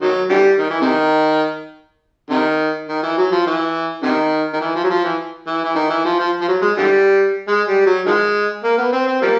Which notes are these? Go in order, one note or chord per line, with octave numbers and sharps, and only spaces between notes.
D#3 F#3
D3 E3 G3
D#3
E3
C3 D#3
C3 D#3
D#3
E3
F#3
F3
E3
C3 D#3
D#3
E3
F3
F#3
F3
E3
E3
E3
D#3
E3
F3
F3
F3
F#3
G#3
D3 E3 G3
G#3
G3
F#3
D#3 F3 G#3
A#3
B3
C4
C4
F3 G3 A#3